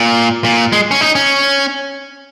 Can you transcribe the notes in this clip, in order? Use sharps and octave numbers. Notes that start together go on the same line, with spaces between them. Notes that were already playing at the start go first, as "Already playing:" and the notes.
Already playing: A#2
A#2
G#3
C#4
D#4
C#4